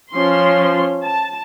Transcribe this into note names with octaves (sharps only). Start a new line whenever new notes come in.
F3 C#4 C6
A5